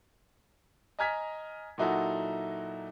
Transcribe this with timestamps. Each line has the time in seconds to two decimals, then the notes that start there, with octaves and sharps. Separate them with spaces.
0.99 D#5 G#5 A#5 F6 G#6 B6
1.78 A#2 F#3 D#4 E4 F#4 A4